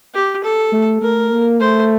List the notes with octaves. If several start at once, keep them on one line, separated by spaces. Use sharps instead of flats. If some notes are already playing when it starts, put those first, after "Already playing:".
G4
A4
A3
A3 A#4
A#3
A3 C5